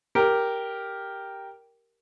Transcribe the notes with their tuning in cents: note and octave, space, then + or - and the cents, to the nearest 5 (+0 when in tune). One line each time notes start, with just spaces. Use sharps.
G4 +0 A#4 +0